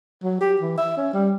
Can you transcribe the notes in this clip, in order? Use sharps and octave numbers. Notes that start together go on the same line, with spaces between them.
F#3
G4
E3
E5
C#4
G3